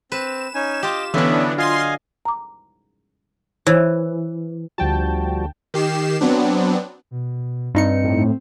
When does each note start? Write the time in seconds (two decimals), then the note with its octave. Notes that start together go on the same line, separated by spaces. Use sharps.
0.12 C4 B4 E7
0.54 C#4 D#4 G#5
0.83 F4 G4 D#5 D6
1.14 D3 E3 F#3 B3 C#4 D4 E5
1.58 F4 D#5 F5 G#5 C6
2.25 A#5 D6
3.67 E3 C5 C#5 E6
4.78 D2 F3 G3 F#4 G5 A5
5.74 D#3 G4 C7 E7
6.21 F#3 B3 C4 D4
7.11 B2
7.74 G2 C4 D#4 C#7
8.04 A2